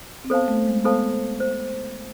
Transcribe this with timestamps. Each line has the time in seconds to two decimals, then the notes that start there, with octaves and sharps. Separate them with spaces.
0.24 C4
0.30 B3 A4 C5 F5 A5
0.48 A3
0.68 G#3
0.85 B3 A4 C5 F5 A5
1.40 C5